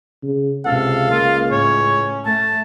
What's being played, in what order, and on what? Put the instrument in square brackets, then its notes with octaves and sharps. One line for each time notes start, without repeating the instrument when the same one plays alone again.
[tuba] C#3
[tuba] C#2 [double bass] C3 [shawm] A4 [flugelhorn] F5
[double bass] A#3 [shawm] F4
[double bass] A2 [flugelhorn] C#4 [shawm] C#5
[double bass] A3 [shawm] A5